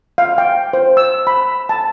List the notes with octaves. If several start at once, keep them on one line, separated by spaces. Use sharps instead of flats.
F5
G5
C5
E6
B5
A5